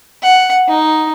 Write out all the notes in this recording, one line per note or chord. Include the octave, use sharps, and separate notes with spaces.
F#5
D#4